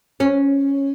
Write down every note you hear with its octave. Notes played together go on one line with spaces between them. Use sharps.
C#4